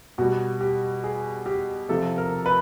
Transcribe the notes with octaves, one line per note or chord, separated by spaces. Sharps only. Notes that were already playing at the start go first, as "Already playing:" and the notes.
B2 G3 F#4
G4
G#4
G4
C3 F3 A4
A#4
B4